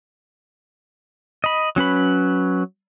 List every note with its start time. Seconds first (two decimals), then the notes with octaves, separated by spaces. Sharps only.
1.44 D#5 B5
1.76 F#3 C#4 B4 B5